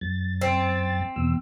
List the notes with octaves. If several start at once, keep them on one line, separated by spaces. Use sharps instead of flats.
F#2 A6
C4
E2 B2 E6